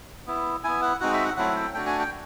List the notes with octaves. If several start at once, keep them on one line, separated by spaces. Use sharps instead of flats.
B3 E4
B3 E4 G#5
F#5
G#3 C4 D#4 F#4 F#5
E5
F#5
F#3 A3 C4 E4 F#5
G5
A3 D4 F#4 G5
G#5
G5